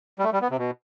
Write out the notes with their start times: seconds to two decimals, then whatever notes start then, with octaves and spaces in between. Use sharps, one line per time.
0.19 G3
0.24 A3
0.33 G3
0.42 B3
0.51 C3
0.59 B2